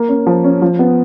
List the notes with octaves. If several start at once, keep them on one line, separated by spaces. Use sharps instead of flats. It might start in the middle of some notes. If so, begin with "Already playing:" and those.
Already playing: A#3
C#4
F3
C#4
F3
B3